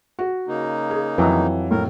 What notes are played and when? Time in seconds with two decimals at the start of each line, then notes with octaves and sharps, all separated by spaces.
0.19 F#4
0.48 C#3 A#3 D#4
0.91 G#4
1.18 F2 E3 F#3 A#5
1.71 A2 A#4